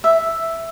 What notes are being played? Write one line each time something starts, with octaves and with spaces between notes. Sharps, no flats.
E5